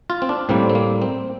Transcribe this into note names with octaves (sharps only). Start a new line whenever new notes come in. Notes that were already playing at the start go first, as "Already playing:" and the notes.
F4
C4
D4
A2 G3 A#3 C4
C4
A#3
C4